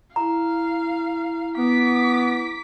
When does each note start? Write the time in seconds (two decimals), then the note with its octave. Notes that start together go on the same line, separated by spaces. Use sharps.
0.16 E4 F5 A#5
1.58 B3 D6 B6